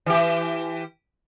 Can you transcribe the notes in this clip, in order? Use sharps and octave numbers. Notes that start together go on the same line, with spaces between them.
E3 G4